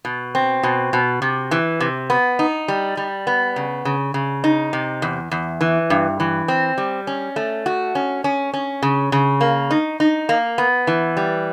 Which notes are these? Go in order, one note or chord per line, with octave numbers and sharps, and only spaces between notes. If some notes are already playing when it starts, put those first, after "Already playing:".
B2
C4
B2
B2
C3
E3
C3
B3
D#4
G3
G3
B3
C#3
C#3
C#3
D#4
C3
E2
E2
E3
G2
E3
C4
G3
C#4
A3
F#4
C#4
C#4
C#4
C#3
C#3
A#3
D#4
D#4
A#3
B3
E3
G3